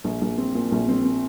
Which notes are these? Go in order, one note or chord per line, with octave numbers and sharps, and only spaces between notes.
A#1
A#1
C4
A#2
A#1
C4
C4